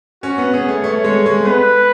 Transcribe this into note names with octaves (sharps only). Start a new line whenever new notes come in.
C#4 F#4
B3
B3 G#4
A3
A3 C#5
G#3
G#3
B3 B4